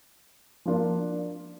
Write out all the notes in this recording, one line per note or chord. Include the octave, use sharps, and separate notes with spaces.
F3 A#3 D4 F4